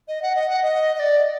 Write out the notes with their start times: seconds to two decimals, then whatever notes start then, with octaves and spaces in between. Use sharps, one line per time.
0.08 D#5
0.22 F#5
0.35 D#5
0.50 F#5
0.63 D#5
0.95 D#5
0.99 D5